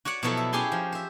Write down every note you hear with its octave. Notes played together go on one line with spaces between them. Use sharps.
F#4 C#5 D5 F#5
B2 F3 F#3 E4 F#4 A4
E5
C#4 E4 G4 G#4 G#5 C6
F3
C5 E5